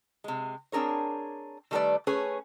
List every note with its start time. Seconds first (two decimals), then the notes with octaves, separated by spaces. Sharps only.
0.24 C3 G#3
0.72 C4 D4 G#4 A#4 C#5
1.71 D#3 G3 A3 A#4 B4 D5
2.07 A3 C#4 G#4 B4 C#5